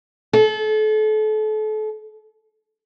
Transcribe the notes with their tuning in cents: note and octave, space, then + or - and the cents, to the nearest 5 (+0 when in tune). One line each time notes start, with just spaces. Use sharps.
A4 -35